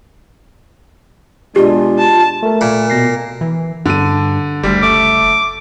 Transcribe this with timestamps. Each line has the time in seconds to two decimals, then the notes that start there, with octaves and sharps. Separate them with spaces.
1.56 B2 G#3 D4 F4 G4
1.99 A5
2.43 A3 A#4
2.61 A#2
2.90 B2 A#6 C7
3.41 E3
3.86 G2 D3 D#7
4.63 F#1 D2 G3
4.83 A3 D6